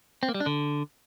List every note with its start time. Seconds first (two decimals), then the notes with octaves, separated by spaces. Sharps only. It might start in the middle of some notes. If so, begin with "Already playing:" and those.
0.23 C4
0.29 A#3
0.35 G3
0.40 D4
0.46 D3